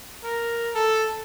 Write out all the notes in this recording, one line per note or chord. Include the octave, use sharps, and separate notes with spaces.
A#4
A4